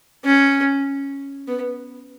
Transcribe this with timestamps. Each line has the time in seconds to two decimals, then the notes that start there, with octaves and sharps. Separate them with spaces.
0.25 C#4
1.48 B3